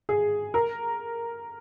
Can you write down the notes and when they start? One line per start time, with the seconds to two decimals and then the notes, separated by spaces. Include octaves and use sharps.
0.09 G#4
0.54 A#4